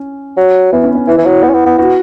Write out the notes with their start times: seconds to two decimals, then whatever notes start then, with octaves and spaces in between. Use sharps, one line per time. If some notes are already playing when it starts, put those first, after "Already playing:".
Already playing: C#4
0.37 F#3
0.72 E3 B3
0.84 C#4
0.95 C#4
1.07 E3 E4
1.18 E3
1.25 F#3
1.43 B3
1.49 C#4
1.54 B3
1.66 B3
1.78 B3 F#4